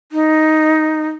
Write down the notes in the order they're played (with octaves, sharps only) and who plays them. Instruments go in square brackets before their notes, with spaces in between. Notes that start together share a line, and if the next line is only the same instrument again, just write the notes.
[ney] D#4